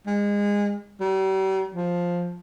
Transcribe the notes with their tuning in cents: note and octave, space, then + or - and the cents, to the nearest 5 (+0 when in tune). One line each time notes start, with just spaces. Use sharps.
G#3 -25
G3 -40
F3 +5